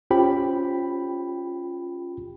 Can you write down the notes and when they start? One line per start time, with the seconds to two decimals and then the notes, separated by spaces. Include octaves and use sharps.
0.11 C#4 F4 G4 C5 G5 B5